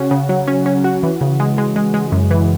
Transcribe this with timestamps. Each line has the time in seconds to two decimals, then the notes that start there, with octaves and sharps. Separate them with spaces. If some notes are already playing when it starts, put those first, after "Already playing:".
Already playing: C#3 C#4 F#4
0.11 C#3
0.29 F#3
0.48 C#4
0.66 C#4
0.84 F#4
1.03 E3
1.21 C#3
1.40 G#3
1.58 G#3
1.76 G#3
1.94 G#3
2.12 F#2
2.31 E3